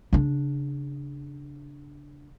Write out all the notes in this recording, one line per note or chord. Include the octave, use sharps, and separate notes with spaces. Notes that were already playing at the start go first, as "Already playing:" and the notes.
C#3 D4